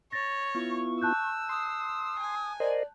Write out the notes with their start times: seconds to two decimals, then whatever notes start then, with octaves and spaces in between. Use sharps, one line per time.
0.12 C#5 A6 A#6
0.55 B3 E4 F4 C#6
1.02 A5 E6 F#6 G6
1.49 C6 D#6
2.19 G#5
2.60 A#4 C5 D5 D#5